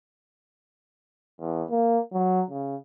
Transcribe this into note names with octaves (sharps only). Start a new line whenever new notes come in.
E2
A#3
F#3
C#3